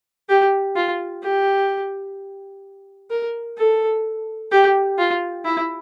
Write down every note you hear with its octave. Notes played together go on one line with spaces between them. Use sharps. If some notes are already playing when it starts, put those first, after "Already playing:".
G4
F4
G4
A#4
A4
G4
F4
E4